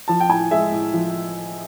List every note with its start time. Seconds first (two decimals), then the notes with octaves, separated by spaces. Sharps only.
0.08 F3 A5
0.20 G5
0.29 A2 G#5
0.51 G#3 E5
0.72 A2
0.93 F3